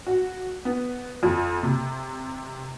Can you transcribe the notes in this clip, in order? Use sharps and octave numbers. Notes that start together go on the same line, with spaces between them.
F#4
B3
F2
C3